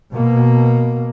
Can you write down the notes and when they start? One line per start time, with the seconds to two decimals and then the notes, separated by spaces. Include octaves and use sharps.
0.13 B2 A#3